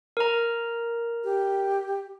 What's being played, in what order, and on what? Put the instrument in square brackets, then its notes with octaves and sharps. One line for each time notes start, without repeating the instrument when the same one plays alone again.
[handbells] A#4 A#5
[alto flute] G4